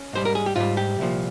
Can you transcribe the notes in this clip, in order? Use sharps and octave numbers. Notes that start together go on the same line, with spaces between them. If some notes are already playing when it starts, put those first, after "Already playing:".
Already playing: C#4
G#2 G3 C5
A#4
G#4
G4
G#2 G3 F4
G4
C2 A#2 F3